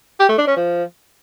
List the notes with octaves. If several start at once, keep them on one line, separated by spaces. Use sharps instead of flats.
G4
A3
D4
C#4
F3